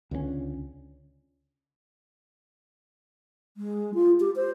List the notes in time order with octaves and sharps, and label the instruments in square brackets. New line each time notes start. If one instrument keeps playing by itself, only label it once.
[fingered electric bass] C#2 D3 G#3 C#4
[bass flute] G#3
F4
G4
C5